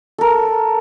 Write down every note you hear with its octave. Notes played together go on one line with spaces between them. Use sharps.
A4 A#4